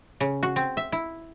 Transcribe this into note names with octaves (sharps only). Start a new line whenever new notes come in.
C#3
F#4
C4
E5
E4